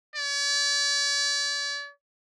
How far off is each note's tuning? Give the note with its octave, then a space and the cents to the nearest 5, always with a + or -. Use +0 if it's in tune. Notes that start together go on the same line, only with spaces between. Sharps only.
D5 -45